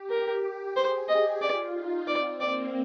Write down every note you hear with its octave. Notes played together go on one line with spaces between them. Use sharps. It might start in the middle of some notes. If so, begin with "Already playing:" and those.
Already playing: G4
A#4
G#4 C5
G4 D#5
F4 D5
D#4
C4 D5
A#3 D5